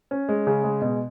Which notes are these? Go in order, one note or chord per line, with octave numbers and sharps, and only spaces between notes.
C#4
G#3
C#3
G#3
B2